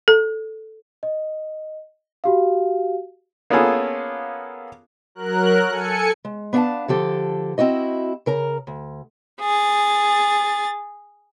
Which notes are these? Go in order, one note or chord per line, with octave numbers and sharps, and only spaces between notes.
A4
D#5
F#4 G4 F5
A#3 B3 C#4 F4 G#4 A4
F#3 A#4 F#6
A4 G#5 C#7
G#3
B3 D4 F5 G5 A5
D3 F3 G4 A4
C4 E4 F#4 D#5
C#3 A#4 A#5
D2
G#4 A6